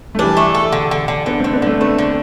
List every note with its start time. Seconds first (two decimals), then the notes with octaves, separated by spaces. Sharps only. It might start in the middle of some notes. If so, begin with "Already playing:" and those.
0.15 A3
0.19 E3 G3 D4
0.37 A3
0.55 A4
0.72 D3
0.91 D3
1.08 D3
1.26 D3 B3 D4
1.40 D3 A3 C4
1.53 B3 D4
1.62 D3 A3 C4
1.80 A3 B3 D4
1.99 D3